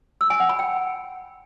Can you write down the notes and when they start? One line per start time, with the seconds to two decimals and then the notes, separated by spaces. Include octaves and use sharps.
0.21 E6
0.30 G#5
0.40 F#5
0.49 B5
0.59 G5